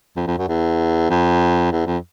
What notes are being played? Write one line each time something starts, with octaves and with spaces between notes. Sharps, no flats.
F2
F2
F#2
E2
F2
E2
F2